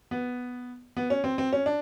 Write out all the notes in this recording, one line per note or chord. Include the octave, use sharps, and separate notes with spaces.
B3
B3
C#4
C4
C4
C#4
D4